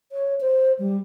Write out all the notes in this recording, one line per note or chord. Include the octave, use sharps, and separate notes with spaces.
C#5
C5
G3